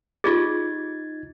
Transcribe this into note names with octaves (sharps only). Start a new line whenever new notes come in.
D#4 F4 G4 G#4 G#6 A6